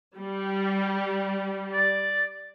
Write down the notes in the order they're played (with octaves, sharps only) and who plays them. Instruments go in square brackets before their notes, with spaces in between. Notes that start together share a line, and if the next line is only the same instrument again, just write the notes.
[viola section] G3
[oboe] D5